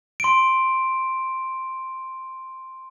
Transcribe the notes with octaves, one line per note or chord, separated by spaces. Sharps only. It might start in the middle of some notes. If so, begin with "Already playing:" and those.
C6 D7